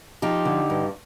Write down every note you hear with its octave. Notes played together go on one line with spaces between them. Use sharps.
F3 D#4 G4
D3
G2